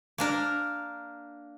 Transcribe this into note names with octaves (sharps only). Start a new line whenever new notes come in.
A#3 D4 A#4